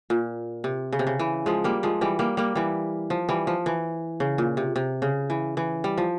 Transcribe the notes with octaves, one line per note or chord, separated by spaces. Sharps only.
A#2
C3
C#3
C3
C#3
E3
F3 G#3
G3 A#3
F3 G#3
E3 G3
G3 A#3
G3 A#3
E3 G3
F3
E3 G3
F3
E3
C#3
A#2
C3
C3
C#3
E3
E3
G3
F3